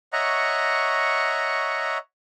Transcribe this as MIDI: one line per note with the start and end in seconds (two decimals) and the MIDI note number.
0.13 1.98 73
0.13 1.98 75
0.13 1.98 76
0.13 1.98 78
0.13 1.98 82
0.13 1.98 85